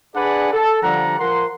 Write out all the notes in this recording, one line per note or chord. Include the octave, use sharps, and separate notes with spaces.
D4 G#4 B4 D5 F#5 G#5
A4
D3 F3 G3 F#5 A#5
F3 A#4 F#5 C6